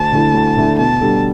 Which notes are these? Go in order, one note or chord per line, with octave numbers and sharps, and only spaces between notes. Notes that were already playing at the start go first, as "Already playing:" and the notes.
Already playing: D2 A5
D3 A3 E4
D2
D3 A3 E4
B2 A5
G3 D4 A4